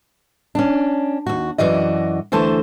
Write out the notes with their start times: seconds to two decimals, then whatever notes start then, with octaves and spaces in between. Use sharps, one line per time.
0.55 C#4 D4
1.27 D#2 F#4
1.58 F#2 C3 E3 F#4 D5 D#5
2.32 D2 E3 A3 C5 A5